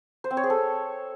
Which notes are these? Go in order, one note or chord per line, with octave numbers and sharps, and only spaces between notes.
C5
C4
C#5
G#4
A4